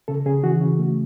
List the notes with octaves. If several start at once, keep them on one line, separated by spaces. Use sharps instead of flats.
C#3 A4
C#3 G#4
E3 F#4
C#3
A3